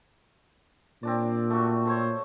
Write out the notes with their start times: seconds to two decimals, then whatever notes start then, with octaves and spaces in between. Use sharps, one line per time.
1.03 A#2 C4 D4 D5
1.50 A3 F#4
1.85 A4 C5 C#5